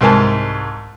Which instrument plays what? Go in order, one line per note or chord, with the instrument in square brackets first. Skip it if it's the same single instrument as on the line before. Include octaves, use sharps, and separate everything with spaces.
[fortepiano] C2 G#2 A#4 G#5 A5